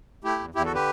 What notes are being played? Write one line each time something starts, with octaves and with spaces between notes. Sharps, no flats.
A3 E4 G4
E2
E2 E4 G4
F#4 A4
D3 G4 B4